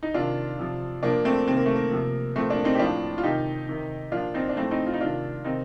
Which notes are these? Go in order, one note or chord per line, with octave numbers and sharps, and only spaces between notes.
D#4
C3 D#3 D4 F4
C3 F3
A#2 F3 A#3 D4
A3 C4
C3 D#3 C4
A#3
A3
A#3
C3 F3
A#2 F3 A3 C4
A#3 D4
C4 D#4
G4
A2 F3 D4 F4
F4
C3 D#3 D#4 G4
C3 D#3
A#2 F3 D4 F4
C4 D#4
D4
A2 F3 A3 C4
C4 D#4
F4
D#4
C3 D#3 D4 F4
C3 D#3 C4 D#4